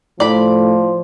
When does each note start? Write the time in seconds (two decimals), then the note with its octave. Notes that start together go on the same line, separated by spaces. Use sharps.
0.20 A2 F3 D5 B5